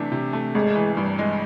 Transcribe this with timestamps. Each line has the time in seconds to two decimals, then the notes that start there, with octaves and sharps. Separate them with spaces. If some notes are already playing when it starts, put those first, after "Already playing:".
Already playing: C3 E3 A3 D4
0.12 C3
0.33 A3
0.54 G#1 G#3
0.75 E3
0.97 G2
1.19 G#3